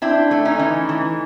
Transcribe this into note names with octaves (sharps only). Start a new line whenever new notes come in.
C4 D4 E4
A3
C#4 D#4
E3
E3